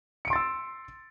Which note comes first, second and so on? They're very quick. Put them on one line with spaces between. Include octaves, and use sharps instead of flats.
C#7 D7 C6 A6 E6